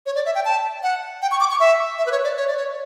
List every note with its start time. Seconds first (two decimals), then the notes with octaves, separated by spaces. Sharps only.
0.06 C#5
0.15 D5
0.26 E5
0.35 G5
0.45 A5
0.83 F#5
1.22 G5
1.31 C#6
1.40 D6
1.50 C#6
1.60 E5
1.98 E5
2.06 B4
2.11 C#5
2.24 D5
2.37 C#5
2.47 D5
2.57 C#5